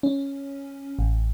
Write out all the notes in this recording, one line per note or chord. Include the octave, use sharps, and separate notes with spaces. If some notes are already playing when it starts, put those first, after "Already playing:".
C#4
A1